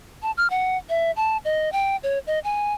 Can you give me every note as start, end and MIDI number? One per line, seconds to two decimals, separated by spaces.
0.22 0.31 81
0.37 0.48 89
0.50 0.77 78
0.89 1.11 76
1.17 1.37 81
1.45 1.72 75
1.72 1.96 79
2.03 2.19 73
2.27 2.39 75
2.44 2.74 80